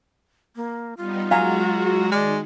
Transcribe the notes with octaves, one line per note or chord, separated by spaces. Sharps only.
A#3
G3 B3 D#4 F4
F#3 G#3 F#4 F5 G#5 A#5
D#3 G#3 D5